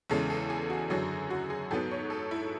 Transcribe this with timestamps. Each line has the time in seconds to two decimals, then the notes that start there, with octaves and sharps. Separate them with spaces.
0.10 E2 C#3 G#3 A4
0.30 A4
0.50 G#4
0.70 F#4
0.90 F#2 D3 F#3 G#4
1.30 F#4
1.50 G#4
1.71 G#2 F#3 B3 A4
1.91 C#5
2.10 A4
2.31 E4